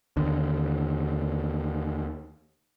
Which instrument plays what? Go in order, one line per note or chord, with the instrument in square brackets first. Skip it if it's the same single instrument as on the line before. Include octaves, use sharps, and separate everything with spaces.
[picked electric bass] D#2 D3